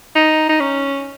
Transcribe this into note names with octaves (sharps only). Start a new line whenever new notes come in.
D#4
D#4
C#4